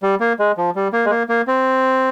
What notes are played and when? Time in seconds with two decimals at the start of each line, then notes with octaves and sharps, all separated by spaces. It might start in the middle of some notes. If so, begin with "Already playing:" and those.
0.03 G3
0.20 A#3
0.39 G#3
0.58 F3
0.75 G3
0.93 A#3
1.06 G#3
1.10 A#3
1.29 A#3
1.47 C4